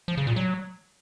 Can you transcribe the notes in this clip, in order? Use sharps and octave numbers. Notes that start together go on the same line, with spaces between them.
F3
C#3
A#2
F#3